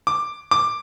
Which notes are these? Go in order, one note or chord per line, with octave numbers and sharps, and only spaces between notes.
D6
D6